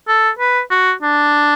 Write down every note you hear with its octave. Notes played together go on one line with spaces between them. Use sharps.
A4
B4
F#4
D4